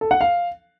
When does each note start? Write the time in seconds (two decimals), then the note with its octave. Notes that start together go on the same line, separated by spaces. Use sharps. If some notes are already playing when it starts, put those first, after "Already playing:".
0.01 A4
0.11 F#5
0.21 F5